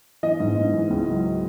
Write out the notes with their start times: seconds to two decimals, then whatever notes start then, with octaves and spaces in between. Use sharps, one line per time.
0.23 E3 D#5
0.40 G#2
0.57 G#2
0.74 E3
0.90 C#2
1.07 F#3